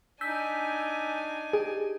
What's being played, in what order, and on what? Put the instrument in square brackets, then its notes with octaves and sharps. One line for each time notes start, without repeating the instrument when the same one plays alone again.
[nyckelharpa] D4 D#4 [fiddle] G#5 [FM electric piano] E6 G6 B6
[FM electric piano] G4 [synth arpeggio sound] G#4